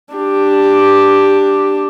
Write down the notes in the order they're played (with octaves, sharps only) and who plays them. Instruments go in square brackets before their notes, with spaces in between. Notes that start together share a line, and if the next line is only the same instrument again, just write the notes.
[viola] D4 G4